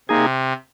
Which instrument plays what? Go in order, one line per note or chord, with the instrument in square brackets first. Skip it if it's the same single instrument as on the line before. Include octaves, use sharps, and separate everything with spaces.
[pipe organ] C3 [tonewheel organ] A#3 D#4 G#4